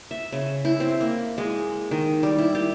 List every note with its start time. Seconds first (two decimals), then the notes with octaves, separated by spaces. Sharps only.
0.11 E5
0.32 C#3
0.65 E4
0.80 C4
1.01 A#3
1.38 G#3
1.91 D#3
2.23 G3
2.39 E4
2.55 G4